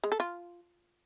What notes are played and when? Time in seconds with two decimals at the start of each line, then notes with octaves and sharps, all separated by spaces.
0.04 G#3
0.12 A4
0.20 F4